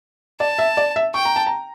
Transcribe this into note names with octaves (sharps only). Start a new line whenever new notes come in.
D5 A5
E5
D5
E5
G5 C#6
A#5
A5
A#5